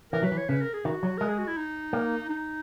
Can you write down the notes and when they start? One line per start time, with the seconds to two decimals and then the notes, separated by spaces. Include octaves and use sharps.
0.13 E3 A#4
0.23 F#3 B4
0.32 E3
0.38 C#5
0.49 C#3 B4
0.61 A#4
0.74 G#4
0.85 D#3 F#4
1.03 F#3
1.18 G#3 A#4
1.28 G#4
1.38 F#4
1.47 E4
1.57 D#4
1.93 A#3
2.29 D#4